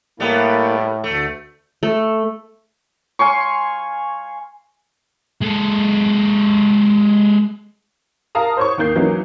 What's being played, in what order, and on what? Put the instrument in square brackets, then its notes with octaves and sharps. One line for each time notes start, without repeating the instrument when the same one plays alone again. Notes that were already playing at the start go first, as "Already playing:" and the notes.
[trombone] A2 [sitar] G3 B3 [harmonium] A#3 E4
[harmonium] D2 [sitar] A3
[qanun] A3
[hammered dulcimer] F5 G#5 C6 C#6
[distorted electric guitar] G#3 A4
[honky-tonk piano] A#4 F5 A5 A#5 D#6
C5 C#5 C#6
D#2 A#3 G6 C7
E3 F#3 A#3 B3 C#4 D#4